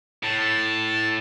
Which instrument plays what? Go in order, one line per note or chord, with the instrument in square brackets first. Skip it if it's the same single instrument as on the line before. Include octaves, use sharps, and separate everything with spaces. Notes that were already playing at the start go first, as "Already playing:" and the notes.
[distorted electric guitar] A2 [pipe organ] A5